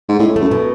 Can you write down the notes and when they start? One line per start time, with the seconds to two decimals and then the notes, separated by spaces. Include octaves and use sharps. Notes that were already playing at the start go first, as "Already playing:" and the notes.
0.09 G#2
0.19 A2 C#4
0.36 A3
0.41 F#2
0.51 B2